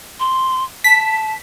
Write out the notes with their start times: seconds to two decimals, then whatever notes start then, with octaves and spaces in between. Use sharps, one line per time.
0.20 C6
0.84 A5 B6